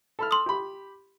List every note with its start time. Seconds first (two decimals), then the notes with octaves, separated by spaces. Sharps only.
0.19 A4 B5 F6
0.31 C6 D#6
0.46 G4 B5